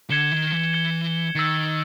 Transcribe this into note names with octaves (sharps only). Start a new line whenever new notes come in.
D3 G#6 C#7 E7 G7
D#3
E3
G#6 C#7 E7 G7
D#3 E6 A6 C#7